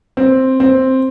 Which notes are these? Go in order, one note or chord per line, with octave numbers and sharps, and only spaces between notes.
C4
C4